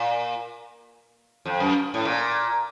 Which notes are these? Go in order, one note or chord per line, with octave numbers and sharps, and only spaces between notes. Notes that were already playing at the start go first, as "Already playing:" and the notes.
Already playing: A#2
F2
F#2
A2
A#2